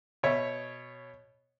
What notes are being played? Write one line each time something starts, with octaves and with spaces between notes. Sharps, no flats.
B2 C#5 E5